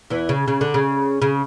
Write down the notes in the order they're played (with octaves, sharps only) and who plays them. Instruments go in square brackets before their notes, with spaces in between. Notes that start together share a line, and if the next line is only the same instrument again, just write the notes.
[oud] E2 E3
C#3
C#3
D3
C#3
C#3